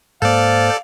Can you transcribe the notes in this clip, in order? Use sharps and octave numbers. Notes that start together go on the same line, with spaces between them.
G#2 A#3 A4 C5 D5 F5